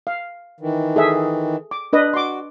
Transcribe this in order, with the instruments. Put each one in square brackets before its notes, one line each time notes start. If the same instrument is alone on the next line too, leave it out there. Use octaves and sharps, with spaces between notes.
[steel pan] F5
[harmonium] D#3 E3
[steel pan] G#4 A4 E5
D6
D4 B4 D#5
[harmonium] F#4 [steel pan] C6 D6